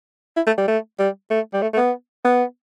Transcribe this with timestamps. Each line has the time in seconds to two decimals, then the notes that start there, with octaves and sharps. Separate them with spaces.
0.37 E4
0.47 A3
0.58 G3
0.68 A3
0.99 G3
1.31 A3
1.54 G3
1.62 A3
1.74 A3
1.77 B3
2.25 B3